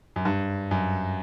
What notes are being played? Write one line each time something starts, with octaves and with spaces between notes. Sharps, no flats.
F#2
G2
F#2